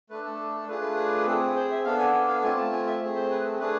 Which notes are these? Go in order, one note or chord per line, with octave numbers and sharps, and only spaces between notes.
A3 D4 A4 B4
A4
A4
A3 D4 F4 G#4 B4
B4
B4
B4
C4 G#4 A4
C5
E5
B3 D4 A4 F5
G#5
G#5
F5
A3 C4 F4 G#5
A5
G#5
E5
A3 C4 G#4
C5
B4
A4
A3 D4 G#4 B4